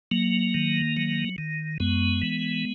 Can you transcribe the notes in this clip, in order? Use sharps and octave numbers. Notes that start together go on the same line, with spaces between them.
F#3 A#3
D#3
F#3
D#3
F#2 G#3 B3
E3